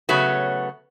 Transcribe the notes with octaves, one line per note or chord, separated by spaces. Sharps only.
C#3 F#3 A3 B3 F#4